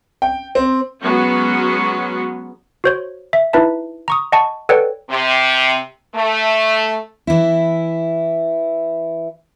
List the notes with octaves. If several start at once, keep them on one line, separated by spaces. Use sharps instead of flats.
G5
C4
F#3 G#3 B3 C#4 F#4
F#4 C5 C#5
E5
D#4 E4 B4 E5 A5
A#5 C#6 D#6
D#5 F#5 G#5 A5 C#6
A4 B4 C#5 D5 F#5 G5
C3
A3
E3 E4